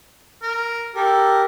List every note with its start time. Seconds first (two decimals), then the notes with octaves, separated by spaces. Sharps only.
0.42 A#4
0.95 G4 A4 A#4